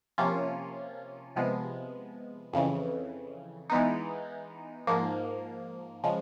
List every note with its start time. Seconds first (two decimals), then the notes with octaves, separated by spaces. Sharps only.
0.18 C3 F3 A#3 C#4 F4
1.36 C3 F3 G#3 B3
2.53 F2 C#3 E3
3.70 E3 G#3 B3 D#4
4.87 G#2 F3 A#3
6.04 C#3 F3 G#3